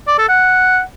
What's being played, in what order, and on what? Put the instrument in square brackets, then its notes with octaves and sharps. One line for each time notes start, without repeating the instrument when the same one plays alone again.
[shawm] D5
A4
F#5